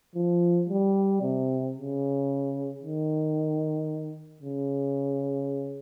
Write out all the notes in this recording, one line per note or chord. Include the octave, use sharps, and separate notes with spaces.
F3
G3
C3
C#3
D#3
C#3